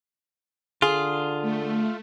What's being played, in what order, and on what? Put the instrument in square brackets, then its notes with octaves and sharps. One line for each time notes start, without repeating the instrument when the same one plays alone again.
[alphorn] D3 [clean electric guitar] F4 [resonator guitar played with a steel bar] G#4
[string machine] A3